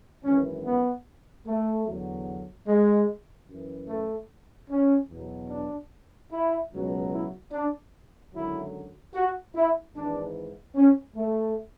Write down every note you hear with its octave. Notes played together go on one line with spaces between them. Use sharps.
G#1 F#2 E3 C#4
B3
A3
E2 D3 F#3
G#3
F#2 E3
A3
C#4
E2 B2 F#3
D4
E4
C#2 B2 F#3
E4
D4
G#1 F#2 D3 F#3 E4
F#4
E4
G#1 G#2 E3 D4
C#4
A3